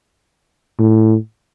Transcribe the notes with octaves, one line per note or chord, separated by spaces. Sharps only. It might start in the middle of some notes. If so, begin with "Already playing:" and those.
A2